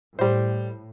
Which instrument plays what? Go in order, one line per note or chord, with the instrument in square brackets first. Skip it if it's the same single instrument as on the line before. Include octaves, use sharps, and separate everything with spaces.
[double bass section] A2 [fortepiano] G3 C5